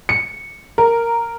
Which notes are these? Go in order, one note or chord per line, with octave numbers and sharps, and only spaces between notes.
C#7
A#4